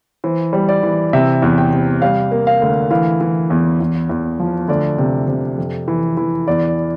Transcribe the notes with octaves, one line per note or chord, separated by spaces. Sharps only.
E3 C5
G3
D5
E3
C3 E5
E2
G5
C3
G3 F5
A#3
F5
D2
E3 F5
E3
E2
E2
E2
F3
D2 D5
C3
C3
F2
E3
E3
E2 D5